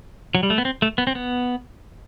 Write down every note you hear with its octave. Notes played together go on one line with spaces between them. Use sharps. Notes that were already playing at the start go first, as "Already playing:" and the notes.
F#3
G3
A3
B3
C4
A3
B3
C4
B3